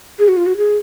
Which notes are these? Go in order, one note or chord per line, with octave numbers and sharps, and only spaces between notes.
G#4
F#4
F4
F#4
G#4